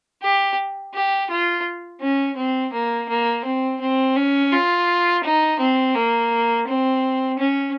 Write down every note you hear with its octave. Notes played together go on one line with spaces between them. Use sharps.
G4
G4
F4
C#4
C4
A#3
A#3
C4
C4
C#4
F4
D#4
C4
A#3
C4
C#4